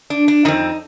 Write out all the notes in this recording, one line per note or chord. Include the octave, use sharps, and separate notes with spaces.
D4
D4
F2 D#3 C4 D#4